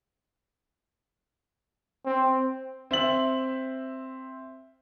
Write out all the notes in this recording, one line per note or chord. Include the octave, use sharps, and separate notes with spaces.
C4
C4 E5 F#7